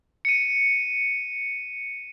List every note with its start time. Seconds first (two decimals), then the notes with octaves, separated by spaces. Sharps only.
0.25 C#7 D#7